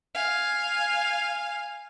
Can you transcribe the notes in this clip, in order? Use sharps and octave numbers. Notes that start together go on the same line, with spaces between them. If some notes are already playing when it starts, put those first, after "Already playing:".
F5 G#5